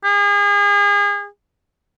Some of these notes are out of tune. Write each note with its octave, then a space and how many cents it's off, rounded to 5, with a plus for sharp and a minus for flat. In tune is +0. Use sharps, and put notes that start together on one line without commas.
G#4 -35